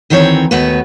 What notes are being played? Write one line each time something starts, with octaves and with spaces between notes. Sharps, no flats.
D2 D#3 E3 C4 C#5
D#2 A3 B3 F#4 B4